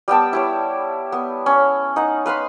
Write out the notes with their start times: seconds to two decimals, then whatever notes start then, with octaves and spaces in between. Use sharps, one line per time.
0.08 G3 B3 G5 A5
0.33 E4 G4 C#5
1.12 B3
1.46 C#4
1.96 D#4 F#5
2.26 B4 F5 B5 C6